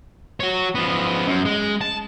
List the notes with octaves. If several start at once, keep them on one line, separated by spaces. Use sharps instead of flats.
F#4 C#5
F3 B3
F#2
G#3
A5